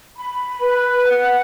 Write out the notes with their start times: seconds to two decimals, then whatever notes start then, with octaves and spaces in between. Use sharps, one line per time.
0.17 B5
0.60 B4
1.07 F#5